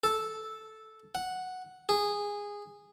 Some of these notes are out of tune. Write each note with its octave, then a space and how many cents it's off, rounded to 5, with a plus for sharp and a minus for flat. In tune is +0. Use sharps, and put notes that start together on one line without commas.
A4 -5
F#5 -5
G#4 -15